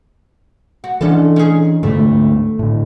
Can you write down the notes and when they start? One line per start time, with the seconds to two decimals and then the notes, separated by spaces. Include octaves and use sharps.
0.84 F#4
1.01 E3 C#4 D4 A4
1.36 C#4 G#4
1.83 D2 G#2 D3 A3
2.59 A2 D3